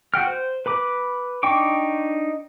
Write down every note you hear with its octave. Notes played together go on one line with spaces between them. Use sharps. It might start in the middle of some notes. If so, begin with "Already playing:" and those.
F#4 F#5 G5 F6
C5
B4 B5 D6
D4 D#4 G5 C#6 D6